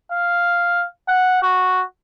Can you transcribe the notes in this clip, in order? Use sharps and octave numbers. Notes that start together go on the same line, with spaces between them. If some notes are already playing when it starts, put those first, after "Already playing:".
F5
F#5
F#4